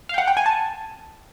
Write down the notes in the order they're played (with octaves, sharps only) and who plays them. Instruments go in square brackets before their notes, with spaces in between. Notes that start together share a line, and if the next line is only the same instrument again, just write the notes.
[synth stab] F5
G5
F#5
G5
G#5
A5